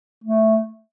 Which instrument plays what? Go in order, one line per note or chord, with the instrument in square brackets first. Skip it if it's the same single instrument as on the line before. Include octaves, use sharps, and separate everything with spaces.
[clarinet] A3